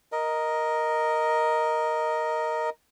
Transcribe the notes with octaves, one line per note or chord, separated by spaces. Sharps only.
A#4 D#5